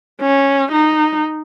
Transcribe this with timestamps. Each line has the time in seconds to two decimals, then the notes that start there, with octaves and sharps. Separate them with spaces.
0.21 C#4
0.72 D#4